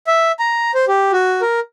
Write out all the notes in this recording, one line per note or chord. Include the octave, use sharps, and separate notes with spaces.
E5
A#5
C5
G4
F#4
A#4